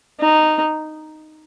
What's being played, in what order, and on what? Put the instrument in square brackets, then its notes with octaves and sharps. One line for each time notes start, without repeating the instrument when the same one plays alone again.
[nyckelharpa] D#4